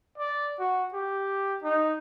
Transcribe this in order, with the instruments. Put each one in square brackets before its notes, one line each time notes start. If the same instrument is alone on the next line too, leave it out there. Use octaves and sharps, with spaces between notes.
[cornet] D5
F#4
G4
D#4